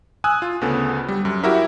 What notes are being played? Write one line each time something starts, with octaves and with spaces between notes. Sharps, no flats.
G#5 D#6 E6 F#6
F4
D2 C#3 B3 A4
G3
F#2
E4 F#4 G4 A#4 E5